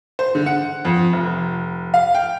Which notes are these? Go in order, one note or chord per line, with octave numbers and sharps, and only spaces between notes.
C5
D3
F#5
F2
F1
F5
G5